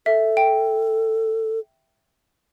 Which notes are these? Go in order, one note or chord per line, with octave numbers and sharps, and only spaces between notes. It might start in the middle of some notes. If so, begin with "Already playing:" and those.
A4 E5
G5